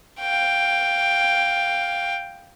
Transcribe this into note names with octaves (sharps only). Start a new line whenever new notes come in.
F5 G5